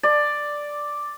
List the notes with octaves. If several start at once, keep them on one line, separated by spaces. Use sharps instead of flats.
D5